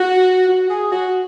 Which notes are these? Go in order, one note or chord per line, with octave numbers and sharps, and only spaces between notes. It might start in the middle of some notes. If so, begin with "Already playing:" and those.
Already playing: F#4
F#4
G#4
F#4